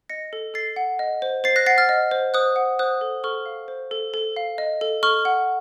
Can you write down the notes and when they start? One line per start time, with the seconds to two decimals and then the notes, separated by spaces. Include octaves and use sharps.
0.10 D#5 A#6 C#7
0.33 A4
0.54 A4 A6 C7
0.76 F#5
0.99 D#5
1.22 C5
1.44 C5 A6 C7
1.56 F#6 A#6
1.66 F#5 A6 C7
1.78 F6 A6
1.89 D#5
2.11 C5
2.34 C5 D#6 F#6
2.56 F#5
2.79 C5 D#6 F#6
3.01 A4
3.24 A4 C#6 F6
3.46 F5
3.68 C5
3.91 A4
4.14 A4
4.36 F5
4.58 D#5
4.81 A4
5.03 A4 C#6 F6
5.25 F#5